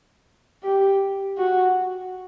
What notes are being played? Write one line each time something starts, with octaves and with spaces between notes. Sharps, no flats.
G4
F#4